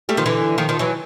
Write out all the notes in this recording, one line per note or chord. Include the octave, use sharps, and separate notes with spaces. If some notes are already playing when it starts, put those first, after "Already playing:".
G3 A3
D#3 F3
D3 E3
D#3 F3
D#3 F3
E3 F#3